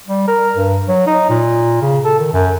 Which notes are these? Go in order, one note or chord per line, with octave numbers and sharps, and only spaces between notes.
G3
A#4
G2
F#3
D#4
A#2
C#3
A4
D#3
F#2